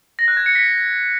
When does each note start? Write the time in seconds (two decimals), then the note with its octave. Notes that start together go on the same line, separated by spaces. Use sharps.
0.19 A#6
0.28 F#6
0.37 G#6
0.46 C#7
0.55 B6